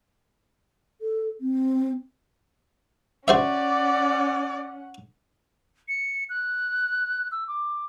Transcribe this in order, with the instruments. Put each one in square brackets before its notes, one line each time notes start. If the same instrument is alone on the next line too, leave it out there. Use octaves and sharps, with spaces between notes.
[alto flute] A4
C4
[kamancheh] C#4 F#5 [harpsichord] F#4 C5 E5 [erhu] D5
[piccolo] C#7
F#6
E6
D6